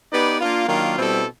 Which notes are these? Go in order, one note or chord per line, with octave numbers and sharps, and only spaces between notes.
B3 D#4 G4 B4 D5
A#3 D4 F4
D#3 F#3 A#3 D4 F4
B2 G3 C4 E4 A4